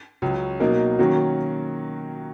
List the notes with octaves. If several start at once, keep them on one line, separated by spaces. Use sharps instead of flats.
C#2 C#3 F#3 C#4
B2 F#3 A#3 D#4 A#4
D#3 F#3 A#3 C#4 F#4